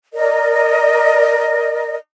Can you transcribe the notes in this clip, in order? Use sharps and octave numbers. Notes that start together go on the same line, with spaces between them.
A#4 D5 D#5